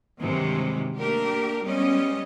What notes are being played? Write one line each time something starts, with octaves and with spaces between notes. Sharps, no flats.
G2 C3 D#3 E3 F#3 G#3
A3 A#3 D4 G4 A#4
G3 G#3 B3 C#4 D#5